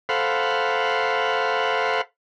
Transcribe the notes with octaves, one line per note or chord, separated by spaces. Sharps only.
A4 C5 F5 F#5 B5